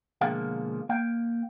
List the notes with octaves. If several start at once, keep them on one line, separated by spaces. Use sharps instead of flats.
B2 D3 F3 G#3 A#3 F4
A#3 G5